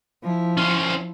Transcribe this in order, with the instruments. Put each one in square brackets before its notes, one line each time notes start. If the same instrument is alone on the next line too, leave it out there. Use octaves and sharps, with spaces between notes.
[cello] F3 E4
[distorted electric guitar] C#4 C5